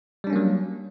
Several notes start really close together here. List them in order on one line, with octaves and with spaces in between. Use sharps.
G3 D4 C#4 A#3 F#3